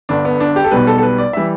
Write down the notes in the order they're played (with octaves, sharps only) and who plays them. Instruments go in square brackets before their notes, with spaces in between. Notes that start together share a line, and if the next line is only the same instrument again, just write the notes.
[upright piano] G1 G2 D3 D4
B3
D4
G4
A4
B1 B2 G3 B4
A4
A4
B4
D5
E3 G3 E5